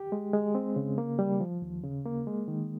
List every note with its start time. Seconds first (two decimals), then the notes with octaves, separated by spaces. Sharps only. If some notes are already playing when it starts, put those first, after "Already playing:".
Already playing: G4
0.12 G#3
0.33 G#3
0.55 C4
0.76 C#3
0.98 A#3
1.19 G3
1.40 F3
1.62 D#2
1.83 C#3
2.06 A#3
2.27 G#3
2.48 D#3